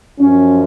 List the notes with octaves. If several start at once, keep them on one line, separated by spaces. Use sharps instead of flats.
F#2 F3 C#4